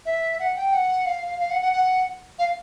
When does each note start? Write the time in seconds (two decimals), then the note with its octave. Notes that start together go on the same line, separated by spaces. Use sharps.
0.06 E5
0.39 F#5
0.56 G5
0.73 F#5
1.06 F5
1.39 F5
1.51 F#5
1.62 F#5
1.72 F#5
2.39 F5